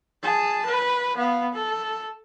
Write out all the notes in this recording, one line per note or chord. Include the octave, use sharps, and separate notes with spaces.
G#4 A5
B4
B3 F5
A4